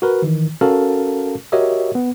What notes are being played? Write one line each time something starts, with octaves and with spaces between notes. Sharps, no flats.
F#4 A#4 B4
D#3 E3
C#4 F#4 A4 A#4 F5 A5
F#4 G4 A#4 C#5 D#5 E5
B3